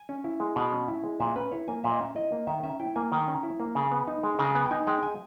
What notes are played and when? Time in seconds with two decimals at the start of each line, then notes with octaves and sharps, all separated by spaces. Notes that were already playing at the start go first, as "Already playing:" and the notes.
Already playing: G#5
0.09 C#4
0.24 E4
0.40 G#3
0.56 B2
0.72 C#4
0.88 E4
1.04 G#3
1.20 A#2 E5
1.35 C#4 B4
1.52 E4 C#5
1.68 A#3 G#5
1.84 A#2 E5
1.91 D#5
1.98 C#4 E5
2.15 E4 D#5
2.32 A#3
2.47 D#3 E5
2.63 C#4 E5
2.80 E4 G5
2.96 A#3 G#5
3.12 D#3
3.28 C#4
3.43 E4
3.60 A#3
3.75 C#3
3.91 B3
4.07 D#4
4.23 G#3
4.39 C#3 A#5
4.55 B3 G#5
4.66 G5
4.71 D#4 G#5
4.87 G#3 G5
5.03 G#5